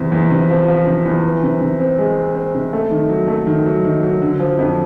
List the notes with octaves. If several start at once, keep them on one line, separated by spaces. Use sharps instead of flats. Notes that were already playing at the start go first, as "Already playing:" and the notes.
Already playing: E2 C3
E2
C3
F3
F3
C3
E2
E3
C3
C3
C4
G#3
C4
C4
C3
A3
D#3
F#3
A3
D#3
F#3
D#3
F#3
D3
F3
F2